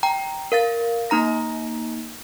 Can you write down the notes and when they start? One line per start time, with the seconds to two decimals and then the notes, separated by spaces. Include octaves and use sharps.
0.03 G5 A#5
0.52 A#4 F5 A6
1.10 A#3 D#4 A#5 A#6